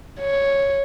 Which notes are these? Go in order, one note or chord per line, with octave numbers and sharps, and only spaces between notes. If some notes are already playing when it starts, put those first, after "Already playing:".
C#5